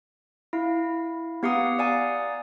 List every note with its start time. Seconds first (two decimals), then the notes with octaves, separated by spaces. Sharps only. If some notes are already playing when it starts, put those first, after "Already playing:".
0.53 E4 F5
1.43 B3 G4 F5 F#5 A#5 D#6
1.79 D5 F5 F#5 G#5 A#5 D#6